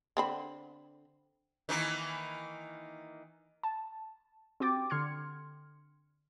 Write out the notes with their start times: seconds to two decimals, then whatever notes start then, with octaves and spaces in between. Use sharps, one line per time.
0.17 D3 C4 B5
1.69 D#3 E3 A#3
3.63 A5
4.60 C4 F#4 G4 G5 D6 A6
4.90 D3 C6 F6 G#6 C#7